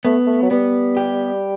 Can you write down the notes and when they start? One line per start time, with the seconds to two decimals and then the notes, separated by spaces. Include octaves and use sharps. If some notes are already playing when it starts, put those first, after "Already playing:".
0.05 A3 B3
0.26 A3
0.42 F#3
0.51 G3 B3
0.97 G4